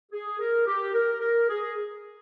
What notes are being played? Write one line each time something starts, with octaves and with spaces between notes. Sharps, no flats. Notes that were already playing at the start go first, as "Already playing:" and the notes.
G#4
A#4
G4
A#4
A#4
G#4